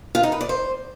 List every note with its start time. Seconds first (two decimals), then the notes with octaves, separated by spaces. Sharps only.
0.15 F4
0.23 D#4
0.32 B4
0.41 D5
0.49 C5